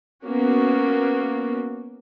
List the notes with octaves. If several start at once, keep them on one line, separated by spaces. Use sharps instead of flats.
A#3 B3 C#4 F#4